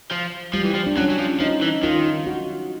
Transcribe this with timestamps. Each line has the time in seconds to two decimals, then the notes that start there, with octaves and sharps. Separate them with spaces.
0.11 F3
0.53 F3 G3
0.64 E3
0.75 F3
0.86 D4
0.97 F#3 C#4
1.10 F#3
1.19 F3
1.40 F3 D#4
1.62 E3
1.83 D#3 F4
2.27 F#4